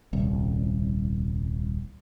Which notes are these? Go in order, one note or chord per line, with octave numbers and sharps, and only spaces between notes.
D#1 C2